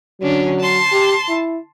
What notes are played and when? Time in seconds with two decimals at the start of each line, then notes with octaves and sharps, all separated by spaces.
0.21 D3 F#3 C#4 D4
0.59 A5 C6
0.92 G4
1.29 E4